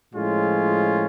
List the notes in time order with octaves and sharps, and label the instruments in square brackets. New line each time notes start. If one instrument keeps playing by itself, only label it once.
[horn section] A2 F3 G#3 C#4 F4